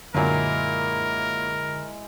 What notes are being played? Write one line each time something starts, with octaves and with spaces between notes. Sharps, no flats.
F#2 A#2 D3 F#3 G#3 E4 A#4